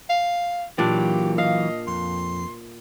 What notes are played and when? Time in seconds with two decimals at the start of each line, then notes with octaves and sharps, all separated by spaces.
0.10 F5
0.78 A#2 E3 F#3 D4 G4 D5
1.38 D#5 F5
1.87 F2 C6